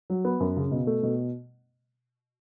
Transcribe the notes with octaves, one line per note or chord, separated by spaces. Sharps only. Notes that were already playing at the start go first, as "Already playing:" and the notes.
F#3
B3
F#2
C#3
B2
A3
B2